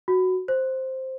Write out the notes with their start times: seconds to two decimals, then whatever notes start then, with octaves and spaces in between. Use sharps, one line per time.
0.08 F#4
0.48 C5